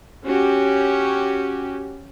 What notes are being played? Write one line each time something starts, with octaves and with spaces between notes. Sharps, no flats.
C#4 F#4 G4